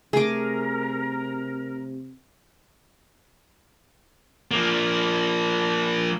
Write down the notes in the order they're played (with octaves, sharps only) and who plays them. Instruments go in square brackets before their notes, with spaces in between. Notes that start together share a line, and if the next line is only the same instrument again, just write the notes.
[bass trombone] C3 [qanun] A3 D6 [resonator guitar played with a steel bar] G#4 [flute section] A#4
[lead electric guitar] F3 A#3